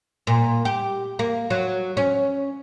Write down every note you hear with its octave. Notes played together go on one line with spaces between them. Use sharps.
A#2
G4
A#3
F#3
C#4